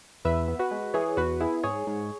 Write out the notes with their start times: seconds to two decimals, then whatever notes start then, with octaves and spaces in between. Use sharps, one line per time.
0.25 E2 B4 E5
0.48 B3
0.59 F#4 B4
0.71 G#3
0.94 E3 G#4 C#5
1.17 E2 F#4 B4
1.41 B3 E4 G#4
1.64 G#2 G#4 C#5
1.87 G#2